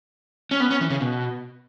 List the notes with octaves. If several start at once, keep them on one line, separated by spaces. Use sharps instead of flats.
C#4
B3
C#4
E3
C#3
B2